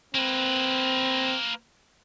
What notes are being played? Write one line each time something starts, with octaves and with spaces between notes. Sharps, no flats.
A#3 C4 B4